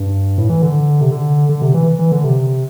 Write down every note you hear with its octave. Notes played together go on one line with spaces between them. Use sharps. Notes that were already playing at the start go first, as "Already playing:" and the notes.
Already playing: G2
A2
E3
D3
C3
D3
D3
C3
E3
E3
D3
C3